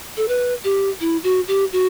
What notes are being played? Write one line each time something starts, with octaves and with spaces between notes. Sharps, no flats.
A4
B4
G4
E4
F#4
G4
F#4